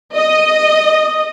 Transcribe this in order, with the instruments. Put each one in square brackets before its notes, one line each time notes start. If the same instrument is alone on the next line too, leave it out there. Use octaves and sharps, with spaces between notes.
[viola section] D#5